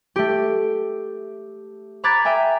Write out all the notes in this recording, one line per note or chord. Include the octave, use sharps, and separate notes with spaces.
A3 G4
A#5 B5 D6 F#6 G#6 A6
E5 G5 G#5 A#5